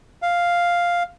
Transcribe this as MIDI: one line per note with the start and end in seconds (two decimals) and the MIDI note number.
0.22 1.03 77